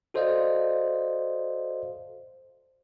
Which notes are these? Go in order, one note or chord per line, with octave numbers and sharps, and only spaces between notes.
F#4 A4 C5 D5 D#5 F5